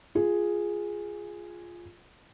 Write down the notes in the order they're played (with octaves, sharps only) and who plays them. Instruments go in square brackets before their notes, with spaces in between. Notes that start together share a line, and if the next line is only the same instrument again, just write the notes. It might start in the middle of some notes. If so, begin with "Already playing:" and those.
[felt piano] F4 G#4